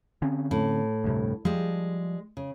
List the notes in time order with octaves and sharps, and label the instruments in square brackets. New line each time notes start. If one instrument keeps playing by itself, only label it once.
[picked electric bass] D3 C4 C#4
[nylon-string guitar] A2
[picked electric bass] D2 G2 C3
[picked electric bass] F3 [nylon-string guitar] G3 G#3
[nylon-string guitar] C#3